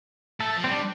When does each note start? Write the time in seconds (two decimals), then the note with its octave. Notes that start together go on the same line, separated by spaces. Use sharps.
0.40 A3 A4
0.56 F3
0.64 G3 C4
0.72 D4